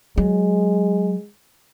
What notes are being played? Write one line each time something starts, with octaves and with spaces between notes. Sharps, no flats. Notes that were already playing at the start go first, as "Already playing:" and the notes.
F#3 G#3